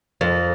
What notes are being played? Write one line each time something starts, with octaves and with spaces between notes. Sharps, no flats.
F2